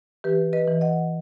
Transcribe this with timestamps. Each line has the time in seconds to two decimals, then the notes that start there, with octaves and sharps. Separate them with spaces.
0.24 E3 G4 B4
0.53 B4 D#5
0.67 E3
0.81 D#5 F#5